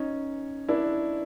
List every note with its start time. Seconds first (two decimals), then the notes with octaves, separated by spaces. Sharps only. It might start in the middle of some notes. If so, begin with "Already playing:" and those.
Already playing: C#4 D#4
0.69 D4 E4